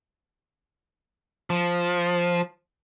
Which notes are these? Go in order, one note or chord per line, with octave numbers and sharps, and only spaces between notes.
F3